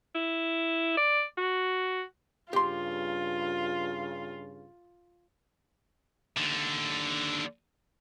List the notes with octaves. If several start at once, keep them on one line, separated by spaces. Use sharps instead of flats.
E4
D5
F#4
G2 C#3 F4 G4 C6
D#2 D3